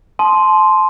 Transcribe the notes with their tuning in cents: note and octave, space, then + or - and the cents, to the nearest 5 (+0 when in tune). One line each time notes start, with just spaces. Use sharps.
A5 -35 C6 +0 D#6 +0